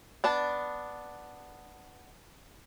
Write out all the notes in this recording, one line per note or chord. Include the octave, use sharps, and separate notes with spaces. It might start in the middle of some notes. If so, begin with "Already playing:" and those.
B3 D4 A5